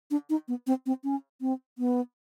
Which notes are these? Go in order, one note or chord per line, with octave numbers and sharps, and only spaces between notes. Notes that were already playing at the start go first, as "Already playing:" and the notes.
D4
D#4
B3
C4
C4
C#4
C4
B3